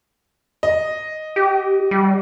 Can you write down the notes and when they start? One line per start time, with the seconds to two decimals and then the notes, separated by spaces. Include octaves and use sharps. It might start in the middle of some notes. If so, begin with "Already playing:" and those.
0.63 D#5
1.36 G4
1.91 G3